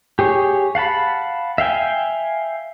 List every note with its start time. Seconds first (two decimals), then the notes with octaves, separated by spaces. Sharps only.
0.19 G4 G#4 C#5
0.75 F5 F#5 A5 B5
1.58 E5 F5 G5 G#5